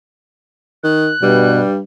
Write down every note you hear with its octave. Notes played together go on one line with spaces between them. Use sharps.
D#3 F#6
G2 B2 G3